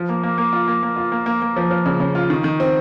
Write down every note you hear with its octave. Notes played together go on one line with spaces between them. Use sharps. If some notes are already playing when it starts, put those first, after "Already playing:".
Already playing: F3
A#3
A#3
A#3
F4
A#3
A#3
F4
A#3
A#3
A#3
F3
F3
C#3
C#3
F4
D#3
D#3
C4